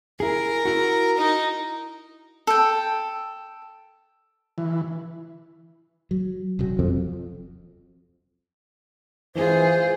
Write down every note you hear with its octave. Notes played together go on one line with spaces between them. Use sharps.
E4 G#4 A#4
E4 F#4
D#4
A4 G5
E3
F#3
E1 C3 F#3
F2
E3 F4 G#4 C5